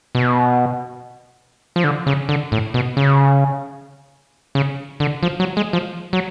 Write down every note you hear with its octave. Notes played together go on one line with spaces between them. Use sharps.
B2
F3
D3
C#3
D3
A2
B2
C#3
C#3
D3
F3
F#3
G#3
F3
F#3